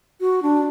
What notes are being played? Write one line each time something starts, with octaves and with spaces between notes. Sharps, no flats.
F#4
D4